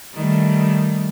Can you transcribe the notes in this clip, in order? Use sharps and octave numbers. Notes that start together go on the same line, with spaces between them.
D#3 G3 A3